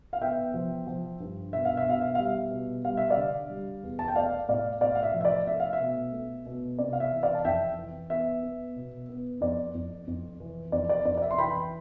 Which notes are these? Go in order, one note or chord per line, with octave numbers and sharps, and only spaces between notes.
F5
B3 E5 G5
F3
F3
G2
B2 E5
F5
E5
B2 F5
E5
G3 F5
E5
B2
G3 F5
E5
D5 F5
D3
G3
E2
A5
G5
A3 D5 F5
A2 D5 F5
A2 D5 F5
F5
E5
F3
E5
D5
A3 E5
F5
E5
B2
A3
B2
C3 D5
F5
E5
E3
D5 F5
A5
F2 E5 G5
E3
B3 E5
B3
B2
B3
F2 D5
F2
F2
E3
F2 D5
D5
F2 D5
D5
E5
C6
E3 G5 B5